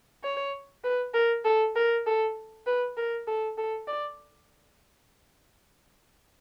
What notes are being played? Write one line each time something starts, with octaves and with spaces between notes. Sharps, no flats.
C#5
B4
A#4
A4
A#4
A4
B4
A#4
A4
A4
D5